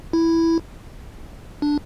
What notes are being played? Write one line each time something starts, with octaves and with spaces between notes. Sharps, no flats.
E4
D4